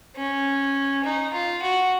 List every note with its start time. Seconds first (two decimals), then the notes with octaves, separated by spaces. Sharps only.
0.17 C#4
1.05 D#4
1.34 F4
1.63 F#4